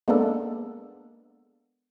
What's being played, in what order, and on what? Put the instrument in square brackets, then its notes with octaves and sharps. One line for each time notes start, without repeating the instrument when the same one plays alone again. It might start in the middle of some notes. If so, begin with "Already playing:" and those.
[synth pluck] G#3 A#3 B3 D4 A4